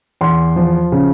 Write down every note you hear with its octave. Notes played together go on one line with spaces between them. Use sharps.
E2 C6
F3
C#3